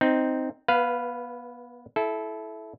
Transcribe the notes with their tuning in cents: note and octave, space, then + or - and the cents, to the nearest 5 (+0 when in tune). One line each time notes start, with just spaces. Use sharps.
C4 -5 D#4 +0
B3 -25 B4 +0 F5 +0
E4 +0 A4 -25